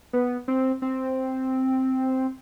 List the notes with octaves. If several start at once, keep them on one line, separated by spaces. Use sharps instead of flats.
B3
C4
C4